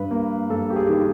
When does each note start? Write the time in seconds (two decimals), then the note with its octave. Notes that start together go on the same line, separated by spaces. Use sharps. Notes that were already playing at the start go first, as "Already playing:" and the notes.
Already playing: G2 B4
0.11 A#3
0.50 G2 A4
0.70 G4
0.76 G#4
0.89 D#3